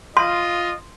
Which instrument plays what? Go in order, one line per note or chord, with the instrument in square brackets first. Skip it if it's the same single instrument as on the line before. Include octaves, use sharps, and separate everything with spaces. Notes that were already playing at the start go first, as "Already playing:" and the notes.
[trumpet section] F4 [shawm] D#5 [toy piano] C6